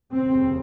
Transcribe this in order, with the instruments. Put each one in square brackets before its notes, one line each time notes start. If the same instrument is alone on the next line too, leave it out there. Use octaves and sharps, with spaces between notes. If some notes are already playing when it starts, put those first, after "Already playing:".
[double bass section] F1 D#2 C#3 C4